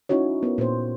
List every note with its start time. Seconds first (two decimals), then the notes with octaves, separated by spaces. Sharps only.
0.09 C#4 D#4 E4 F#4 C#5
0.43 B3 A#4
0.58 A#2 C5